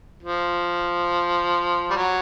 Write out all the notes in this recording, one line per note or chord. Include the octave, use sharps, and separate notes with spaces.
F3
G3
F#3